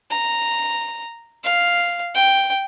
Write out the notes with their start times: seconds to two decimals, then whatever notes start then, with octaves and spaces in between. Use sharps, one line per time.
0.10 A#5
1.44 F5
2.14 G5